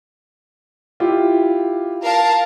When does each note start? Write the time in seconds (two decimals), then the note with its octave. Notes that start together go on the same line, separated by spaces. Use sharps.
1.00 E4 F4 G4
2.03 A#4 F5 A5